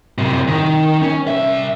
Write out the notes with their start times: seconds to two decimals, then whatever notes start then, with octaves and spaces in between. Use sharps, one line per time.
0.18 F#2 C3
0.48 D#3
1.02 C#4
1.27 C2 E5